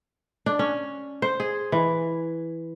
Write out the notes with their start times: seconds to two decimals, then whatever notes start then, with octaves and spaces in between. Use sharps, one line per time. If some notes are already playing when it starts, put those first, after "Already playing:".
0.46 D4
0.59 C#4
1.22 C5
1.40 G#4
1.72 E3